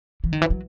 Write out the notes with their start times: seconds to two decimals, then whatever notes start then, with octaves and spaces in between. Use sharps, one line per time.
0.24 E3
0.33 D#3
0.42 E3
0.50 F#3